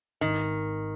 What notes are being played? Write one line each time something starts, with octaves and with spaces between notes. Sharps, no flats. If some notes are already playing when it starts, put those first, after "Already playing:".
G#1 D#3